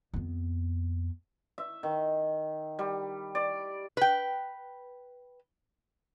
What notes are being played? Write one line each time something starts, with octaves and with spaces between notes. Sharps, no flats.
F2 B3
E5
D#3
G3
D5
B4 G5